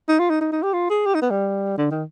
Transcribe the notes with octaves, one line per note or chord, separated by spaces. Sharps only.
D#4
F4
D#4
D#4
D#4
G4
F4
G#4
G4
D#4
B3
G3
D3
D#3